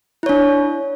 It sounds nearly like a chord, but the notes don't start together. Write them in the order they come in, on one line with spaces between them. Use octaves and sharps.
E4 C#5 D4